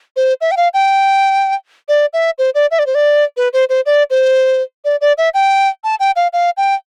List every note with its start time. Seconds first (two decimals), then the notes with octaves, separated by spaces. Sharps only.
0.16 C5
0.41 E5
0.51 G5
0.57 F5
0.74 G5
1.89 D5
2.13 E5
2.38 C5
2.55 D5
2.71 E5
2.79 D5
2.86 C5
2.95 D5
3.37 B4
3.53 C5
3.69 C5
3.86 D5
4.10 C5
4.85 D5
5.01 D5
5.18 E5
5.34 G5
5.84 A5
6.00 G5
6.16 F5
6.33 F5
6.57 G5